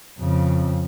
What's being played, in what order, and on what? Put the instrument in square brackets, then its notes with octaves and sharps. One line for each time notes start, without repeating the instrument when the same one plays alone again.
[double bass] F2 C#3